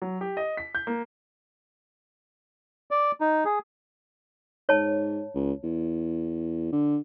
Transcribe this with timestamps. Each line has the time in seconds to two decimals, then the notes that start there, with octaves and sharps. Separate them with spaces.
0.02 F#3
0.21 G4
0.37 D#5
0.57 B6
0.75 G6
0.87 A#3
2.91 D5
3.21 D#4
3.45 G#4
4.69 G#2 C#5 A5
5.34 C#2
5.63 E2
6.72 D3